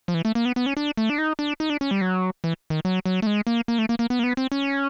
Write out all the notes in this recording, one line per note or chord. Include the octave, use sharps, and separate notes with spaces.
F3
E3
A3
A#3
B3
B3
C#4
D4
A3
D4
D#4
D4
D#4
D4
C#4
G3
F#3
E3
D#3
F#3
F#3
A3
G#3
A#3
A#3
A3
A#3
A#3
B3
A#3
B3
C4
C#4